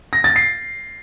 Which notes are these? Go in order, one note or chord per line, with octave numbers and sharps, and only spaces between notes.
A#6
A6
C7